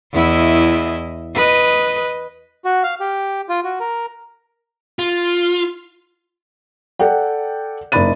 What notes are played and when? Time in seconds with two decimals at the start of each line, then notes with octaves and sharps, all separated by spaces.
0.14 E2 E4 D#5
1.35 B4 D#5
2.65 F#4
2.83 F5
3.00 G4
3.49 F4
3.64 F#4
3.80 A#4
4.99 F4
6.99 A4 D5 F#5 G5
7.92 F#1 D#4 D5 B5 A6 D#7